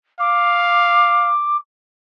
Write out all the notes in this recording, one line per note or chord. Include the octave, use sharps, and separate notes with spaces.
F5 D6